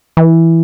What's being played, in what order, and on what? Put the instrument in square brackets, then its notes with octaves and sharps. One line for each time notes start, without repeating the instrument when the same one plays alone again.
[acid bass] E3